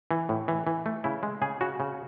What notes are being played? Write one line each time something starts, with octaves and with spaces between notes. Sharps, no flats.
E3
A2
E3
E3
A3
C#3 E4
G#3
C#3 G#4
C#3 F#4
C#3